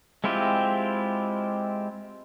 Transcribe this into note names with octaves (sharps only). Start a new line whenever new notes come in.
G#3 C4 E4 F4 G4